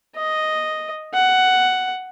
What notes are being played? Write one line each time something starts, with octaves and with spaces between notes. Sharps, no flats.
D#5
F#5